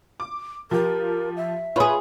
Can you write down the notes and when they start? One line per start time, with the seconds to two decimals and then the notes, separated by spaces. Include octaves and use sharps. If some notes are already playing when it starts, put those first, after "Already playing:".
0.20 D6
0.71 F3 G4 A#4
1.37 E5
1.76 F4 G#4 B4 C#5 B5